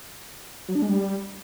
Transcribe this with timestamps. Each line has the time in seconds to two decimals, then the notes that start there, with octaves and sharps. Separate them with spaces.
0.68 F#3
0.75 D4
0.82 G#3
0.89 G3